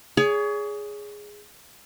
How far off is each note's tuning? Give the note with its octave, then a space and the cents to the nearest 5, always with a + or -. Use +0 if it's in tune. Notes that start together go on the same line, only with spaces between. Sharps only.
G#4 +0 C#5 +35